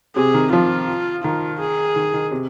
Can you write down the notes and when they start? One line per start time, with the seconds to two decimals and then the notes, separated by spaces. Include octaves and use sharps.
0.16 C3 G#4
0.34 D#3
0.52 F3 F4
1.23 D#3 F4
1.60 G#4
1.96 D#3
2.14 D#3
2.31 C3